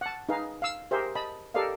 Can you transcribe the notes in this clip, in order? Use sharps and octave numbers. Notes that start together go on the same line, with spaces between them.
F#5 A5
D#4 G#4 B4 F5
F5 E6
G4 G#4 A#4 C5 E5
D#5 A5 B5
G4 A4 A#4 D5 D#5 F5